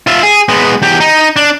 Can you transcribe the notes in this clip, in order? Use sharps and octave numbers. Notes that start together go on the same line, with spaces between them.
F4 E5
G#4
G#3 B3
E2 G4
D#4
D4